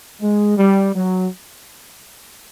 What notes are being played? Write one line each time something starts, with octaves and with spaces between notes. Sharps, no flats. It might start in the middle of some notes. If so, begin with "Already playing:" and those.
G#3
G3
F#3